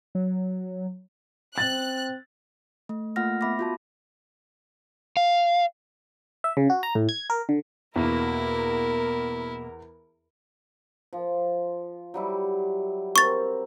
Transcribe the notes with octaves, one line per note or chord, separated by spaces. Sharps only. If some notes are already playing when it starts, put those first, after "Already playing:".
F#3
C4 F#6 A6
A3
A3 A#3 F4 F#5 F6 A#6
B3 E5 B5 D6 A#6
F4 F#4 A5
F5
E5
C#3
F#4
A#5
A2
G#6
A#4
D3
E2 B2 A#3 E4 A#4
F3
F#3 G3 E4
C4 A#4 C#6 A6